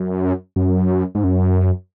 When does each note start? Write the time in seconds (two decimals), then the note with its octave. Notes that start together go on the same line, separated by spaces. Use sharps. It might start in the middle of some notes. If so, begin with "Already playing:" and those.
Already playing: F#2
0.56 F#2
1.15 G#2
1.24 F#2